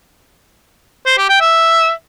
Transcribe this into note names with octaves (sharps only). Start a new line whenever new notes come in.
C5
G4
G5
E5